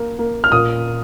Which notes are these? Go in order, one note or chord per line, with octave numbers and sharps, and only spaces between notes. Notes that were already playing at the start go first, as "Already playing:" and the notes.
Already playing: A#3
A#3
F6
A#2 D#6